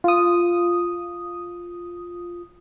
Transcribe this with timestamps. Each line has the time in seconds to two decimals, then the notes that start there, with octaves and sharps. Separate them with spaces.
0.04 F4 D#6